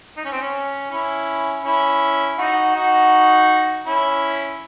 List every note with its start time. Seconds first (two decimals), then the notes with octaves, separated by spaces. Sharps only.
0.17 D#4
0.25 C#4
0.32 C4
0.41 C#4
0.91 C#4 E4
1.64 C#4 E4
2.38 D#4 F#4
2.76 D#4 F#4
3.86 C#4 E4